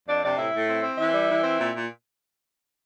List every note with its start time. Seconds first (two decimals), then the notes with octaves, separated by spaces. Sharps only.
0.08 F2 D4 D5
0.23 C3 D4 D5
0.38 A2 E4 E5
0.54 A2
0.68 C4
0.83 C4
0.98 E3 E4 E5
1.14 G3
1.28 E3
1.43 C4
1.58 A#2
1.74 A#2